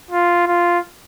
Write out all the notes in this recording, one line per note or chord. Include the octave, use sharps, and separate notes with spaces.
F4
F4